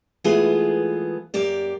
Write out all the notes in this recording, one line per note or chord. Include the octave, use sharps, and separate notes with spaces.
E3 G#3 A3 B3 F4 G#4
F#2 A#3 G4 D5